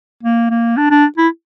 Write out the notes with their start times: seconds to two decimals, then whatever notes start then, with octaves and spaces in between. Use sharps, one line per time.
0.23 A#3
0.50 A#3
0.77 D4
0.91 D4
1.18 E4